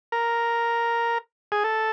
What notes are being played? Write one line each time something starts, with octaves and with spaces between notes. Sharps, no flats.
A#4
G#4
A4